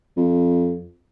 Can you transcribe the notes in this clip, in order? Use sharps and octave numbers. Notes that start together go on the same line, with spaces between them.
F2